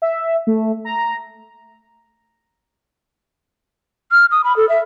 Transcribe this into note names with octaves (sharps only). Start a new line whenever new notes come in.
E5
A3
A#5
F6
D#6
B5
A4
E5